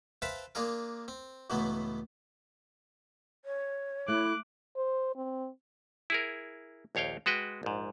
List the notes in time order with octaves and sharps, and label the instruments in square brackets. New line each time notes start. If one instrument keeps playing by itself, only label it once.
[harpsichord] B4 C5 E5 F5 G5 A5
A#3 D4 F4 G#4 A#4
C4
C#2 A2 E3 F#3 A3 B3
[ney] C#5
[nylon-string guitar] A3 [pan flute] E4 [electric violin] D6 F#6
[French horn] C5
C4
[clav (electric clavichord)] E4 G#4 A#4
A#1 D#2 C#5 F5 G5
G#3 F#4 B4 G5
A#1 G#2